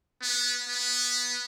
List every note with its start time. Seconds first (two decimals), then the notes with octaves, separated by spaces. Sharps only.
0.22 B3
0.68 B3